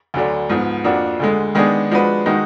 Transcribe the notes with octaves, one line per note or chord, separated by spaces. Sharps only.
D2 D3 F#3 D4
G#2 F3 B3
F2 F3 A#3 D4 F#4
D2 D3 G#3
D#3 G#3 B3 D4 G#4
F3 G#3 D4 F#4 B4
D#3 G#3 D#4 F#4